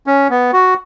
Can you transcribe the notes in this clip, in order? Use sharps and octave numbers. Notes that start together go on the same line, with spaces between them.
C#4
B3
F#4